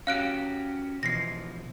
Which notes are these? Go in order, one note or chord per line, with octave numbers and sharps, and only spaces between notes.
C#4 F#4 G4 F5 F#6 D7
B2 E3 F3 A#6 C7